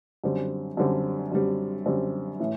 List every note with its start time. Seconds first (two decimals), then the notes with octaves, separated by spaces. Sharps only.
0.24 F#2 D3 G3 C4
0.77 F#2 D3 G3 C4
1.31 F#2 D3 G3 C4
1.86 F#2 D3 G3 C4
2.40 A2 E3